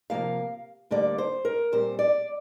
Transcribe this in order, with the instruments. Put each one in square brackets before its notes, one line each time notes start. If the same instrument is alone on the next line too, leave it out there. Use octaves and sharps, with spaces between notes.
[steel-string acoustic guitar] C3 F3 A#3 F5
D2 D3 G3 A#3 D5
C5
A#4
A#2 G3 C4 C5
D5